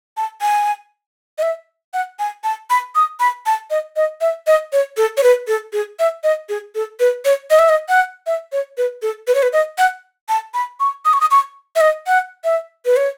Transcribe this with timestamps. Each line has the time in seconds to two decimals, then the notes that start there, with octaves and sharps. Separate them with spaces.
0.17 A5
0.41 G#5
1.38 D#5
1.42 E5
1.94 F#5
2.19 G#5
2.44 A5
2.70 B5
2.95 D#6
3.20 B5
3.46 A5
3.70 D#5
3.96 D#5
4.21 E5
4.47 D#5
4.73 C#5
4.97 A4
5.17 C#5
5.23 B4
5.47 A4
5.73 G#4
5.99 E5
6.23 D#5
6.49 G#4
6.75 A4
7.00 B4
7.25 C#5
7.50 D#5
7.59 E5
7.69 D#5
7.89 F#5
8.26 E5
8.52 C#5
8.77 B4
9.02 A4
9.27 B4
9.35 C#5
9.43 B4
9.53 D#5
9.78 F#5
10.29 A5
10.54 B5
10.80 C#6
11.05 D#6
11.13 C#6
11.21 D#6
11.31 C#6
11.76 E5
11.81 D#5
12.07 F#5
12.44 E5
12.86 B4
12.96 C#5